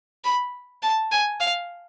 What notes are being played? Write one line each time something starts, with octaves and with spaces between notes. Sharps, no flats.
B5
A5
G#5
F5